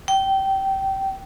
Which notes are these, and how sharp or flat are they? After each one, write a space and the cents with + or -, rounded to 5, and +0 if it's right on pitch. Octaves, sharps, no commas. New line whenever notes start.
G5 -20